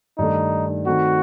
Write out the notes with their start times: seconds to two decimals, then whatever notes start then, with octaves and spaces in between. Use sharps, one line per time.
0.18 G2 D#3 A3 D#4
0.86 D#3 A3 C4 F#4